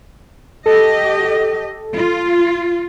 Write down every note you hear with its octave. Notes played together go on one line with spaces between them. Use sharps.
G4 A4 D#5
F4